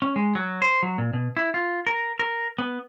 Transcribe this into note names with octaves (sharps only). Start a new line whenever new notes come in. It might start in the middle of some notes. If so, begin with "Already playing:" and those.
C#4
G#3
F#3
C5
F#3
A#2
B2
E4
F4
A#4
A#4
B3